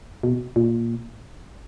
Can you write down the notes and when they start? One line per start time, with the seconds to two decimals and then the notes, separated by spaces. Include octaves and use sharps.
0.23 B2
0.56 A#2